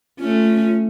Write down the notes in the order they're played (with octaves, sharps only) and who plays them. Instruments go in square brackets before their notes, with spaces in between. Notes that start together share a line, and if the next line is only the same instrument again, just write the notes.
[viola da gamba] A3 C#4 [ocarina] F4